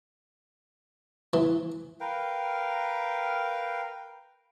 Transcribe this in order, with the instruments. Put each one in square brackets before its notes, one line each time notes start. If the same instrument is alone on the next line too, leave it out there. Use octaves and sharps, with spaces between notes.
[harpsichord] E3
[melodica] A#4 B4 F5 G5